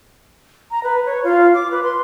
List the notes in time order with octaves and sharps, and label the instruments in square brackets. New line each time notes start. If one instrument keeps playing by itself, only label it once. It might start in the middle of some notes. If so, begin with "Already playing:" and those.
[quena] A#5
B4
C#5
F4
D6
B4
C6